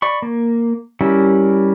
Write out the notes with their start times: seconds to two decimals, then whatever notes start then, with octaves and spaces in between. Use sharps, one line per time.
0.02 D5 B5 C#6
0.22 A#3
1.01 G3 C#4 E4 A#4